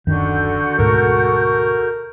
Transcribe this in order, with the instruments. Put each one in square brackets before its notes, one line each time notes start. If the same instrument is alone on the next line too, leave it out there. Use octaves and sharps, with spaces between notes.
[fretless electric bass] D1 F#2 D#3 [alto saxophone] D3 [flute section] F#4 A4 G6
[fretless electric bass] D2 G#2 B2 [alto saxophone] A#4